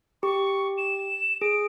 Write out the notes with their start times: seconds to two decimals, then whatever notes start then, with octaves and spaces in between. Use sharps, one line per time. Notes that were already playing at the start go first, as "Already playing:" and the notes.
0.23 G4 C#6
0.78 E7
1.42 G#4 D7